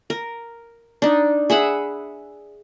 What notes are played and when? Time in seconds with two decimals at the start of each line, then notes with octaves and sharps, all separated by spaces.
0.10 A#4
1.02 D4 D#4
1.50 G#4 E5 F#5 B5